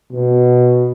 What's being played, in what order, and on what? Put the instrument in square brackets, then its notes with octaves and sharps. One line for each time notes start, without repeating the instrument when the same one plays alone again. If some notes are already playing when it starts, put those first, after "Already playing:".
[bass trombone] B2